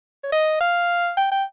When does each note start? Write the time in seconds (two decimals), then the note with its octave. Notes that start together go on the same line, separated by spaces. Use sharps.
0.24 C#5
0.32 D#5
0.60 F5
1.17 G5
1.31 G5